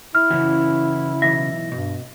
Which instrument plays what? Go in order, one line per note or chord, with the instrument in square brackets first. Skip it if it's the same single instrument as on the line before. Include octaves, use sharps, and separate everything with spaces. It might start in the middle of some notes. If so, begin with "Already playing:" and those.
[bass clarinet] E4 [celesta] F6
[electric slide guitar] C#3 C#4 F#4 [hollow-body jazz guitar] E3
[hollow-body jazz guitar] B1 E3 E5 [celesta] A#6
[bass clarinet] G2 [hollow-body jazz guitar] B2